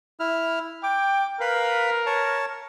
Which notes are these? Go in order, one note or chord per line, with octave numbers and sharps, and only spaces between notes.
E4 F6
G5 D6
A#4 B4 F5 B5
C#5 A5